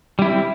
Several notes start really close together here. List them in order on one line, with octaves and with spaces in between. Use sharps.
G3 E4 C4